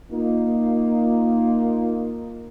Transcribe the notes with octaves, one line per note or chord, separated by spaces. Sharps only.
A#3 D#4 F4